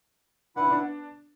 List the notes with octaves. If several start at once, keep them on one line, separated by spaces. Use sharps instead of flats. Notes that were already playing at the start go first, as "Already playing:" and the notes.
D4 E4 B4 F#5
C#4
B3 D4